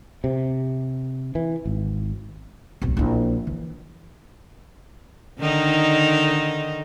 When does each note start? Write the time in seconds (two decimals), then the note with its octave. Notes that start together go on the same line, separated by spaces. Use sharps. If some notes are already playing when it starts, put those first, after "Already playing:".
0.24 C3
1.35 E3
1.66 G#1
2.82 D1 B1
2.97 A#1 E4
3.47 E3
5.39 D3 D#3 D#4